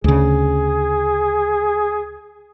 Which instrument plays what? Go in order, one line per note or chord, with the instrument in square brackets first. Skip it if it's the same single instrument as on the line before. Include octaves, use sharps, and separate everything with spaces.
[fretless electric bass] D2 C#3 [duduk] G#4